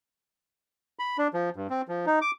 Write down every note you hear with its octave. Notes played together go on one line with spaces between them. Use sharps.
B5
D4
F3
G2
C4
F3
D#4
D6